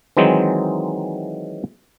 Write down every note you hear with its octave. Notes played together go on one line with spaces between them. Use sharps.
D#3 E3 F#3 G#3 C4 D#4